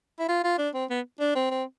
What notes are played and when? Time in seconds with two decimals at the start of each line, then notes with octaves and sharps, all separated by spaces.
0.19 E4
0.29 F4
0.44 F4
0.58 D4
0.74 C4
0.90 B3
1.20 D4
1.35 C4
1.51 C4